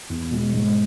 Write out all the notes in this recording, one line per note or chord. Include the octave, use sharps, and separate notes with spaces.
E2
B2 G#3
G#2